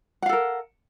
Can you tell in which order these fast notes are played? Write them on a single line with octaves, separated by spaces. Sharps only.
F#5 F5 A4 A#4